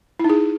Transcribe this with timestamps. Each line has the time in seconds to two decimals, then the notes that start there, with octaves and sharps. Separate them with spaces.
0.19 E4
0.25 D#4
0.30 G#4